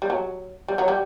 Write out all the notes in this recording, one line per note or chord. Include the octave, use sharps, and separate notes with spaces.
G3
F#3
G3
F#3
G3